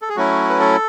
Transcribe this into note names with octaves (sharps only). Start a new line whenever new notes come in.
A4
G#4
F#3 A3 C#4 E4 F#4
B4
A4